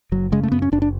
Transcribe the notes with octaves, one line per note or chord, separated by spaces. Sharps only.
F#1 F#3
C#3 G#3
A3
F#2 B3
C#4
F#1 D4
D4